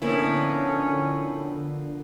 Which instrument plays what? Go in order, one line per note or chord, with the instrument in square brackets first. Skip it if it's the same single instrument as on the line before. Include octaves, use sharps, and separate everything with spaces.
[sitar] A2 E4 [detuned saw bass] D3 [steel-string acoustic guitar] F3 A#3 B3 [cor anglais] C#4